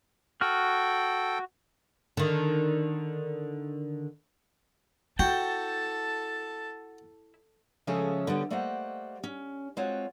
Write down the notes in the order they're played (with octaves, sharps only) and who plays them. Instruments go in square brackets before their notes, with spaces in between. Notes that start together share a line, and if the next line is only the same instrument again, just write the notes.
[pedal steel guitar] F#4 F6 [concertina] A4 G5
[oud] D3 D#3
[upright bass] E4 [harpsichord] F#4 [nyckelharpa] A4 A5 [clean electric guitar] G5
[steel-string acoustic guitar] C#3 F3 G#3 A3 C#4 A4
D3 G3 B3 C#4
G3 A3 A#3 C5 D#5 F#5
C#4
G#3 C4 F4 F#4 C#5